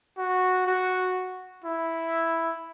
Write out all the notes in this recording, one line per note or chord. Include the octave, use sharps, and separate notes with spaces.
F#4
F#4
E4